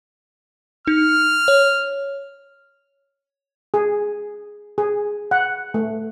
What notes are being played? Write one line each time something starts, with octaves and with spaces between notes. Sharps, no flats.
D#4 F6
C#5
G#4
G#4
F#5
A3